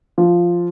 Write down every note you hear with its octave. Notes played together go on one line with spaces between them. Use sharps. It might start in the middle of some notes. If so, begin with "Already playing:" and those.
F3